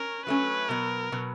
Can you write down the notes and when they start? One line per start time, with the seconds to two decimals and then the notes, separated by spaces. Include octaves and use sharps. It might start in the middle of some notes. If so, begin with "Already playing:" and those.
Already playing: C#4 A#4
0.26 F#3 A3 C#4 B4
0.69 B2 F#3 B3 A#4
1.12 B2 F#3 B3